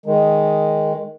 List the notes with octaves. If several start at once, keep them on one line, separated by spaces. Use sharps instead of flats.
D#3 G#3